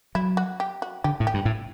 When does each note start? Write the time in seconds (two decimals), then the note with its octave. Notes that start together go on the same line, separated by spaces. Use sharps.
0.15 F#3 E4
0.37 F#4
0.60 G4
0.82 F#4
1.04 D3 G4
1.20 A2
1.27 G4
1.34 G2
1.45 A2